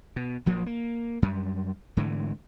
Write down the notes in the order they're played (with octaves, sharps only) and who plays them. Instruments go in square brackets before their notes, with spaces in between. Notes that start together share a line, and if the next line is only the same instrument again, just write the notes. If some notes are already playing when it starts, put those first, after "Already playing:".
[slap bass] B2
A#1 F3 F#3 A#3
A#3
F#2 G3
G#2 D3 E3 A3